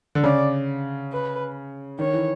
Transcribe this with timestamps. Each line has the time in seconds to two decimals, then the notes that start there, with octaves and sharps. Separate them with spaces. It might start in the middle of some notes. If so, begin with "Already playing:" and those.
0.15 D3
0.24 C#3 D5
1.12 B4
1.99 D#3 C#5
2.14 E3